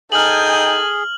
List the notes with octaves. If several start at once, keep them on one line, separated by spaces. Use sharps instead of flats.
D#4 G#4 A4 G5 G#5 F6 F#7